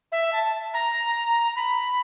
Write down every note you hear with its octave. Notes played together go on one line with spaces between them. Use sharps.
E5
A5
A#5
B5